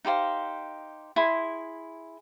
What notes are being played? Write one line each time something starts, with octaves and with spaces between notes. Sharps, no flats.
D#4 G4 C5 F5
E4 G#4 C6